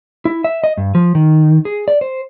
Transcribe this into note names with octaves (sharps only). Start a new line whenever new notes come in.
E4
E5
D#5
G2
F3
D#3
G#4
D5
C5